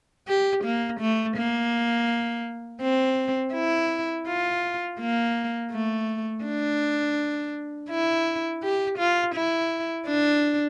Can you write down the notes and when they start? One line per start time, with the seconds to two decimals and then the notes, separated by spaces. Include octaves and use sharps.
0.27 G4
0.64 A#3
1.00 A3
1.37 A#3
2.82 C4
3.54 E4
4.27 F4
5.00 A#3
5.71 A3
6.44 D4
7.90 E4
8.62 G4
8.98 F4
9.35 E4
10.07 D4